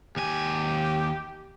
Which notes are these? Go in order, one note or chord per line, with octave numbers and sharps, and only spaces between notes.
D#2 G4 G#5